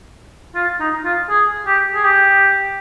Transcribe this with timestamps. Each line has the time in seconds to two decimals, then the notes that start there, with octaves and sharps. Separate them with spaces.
0.55 F4
0.80 D#4
1.04 F4
1.29 G#4
1.67 G4
1.94 G#4
2.05 G4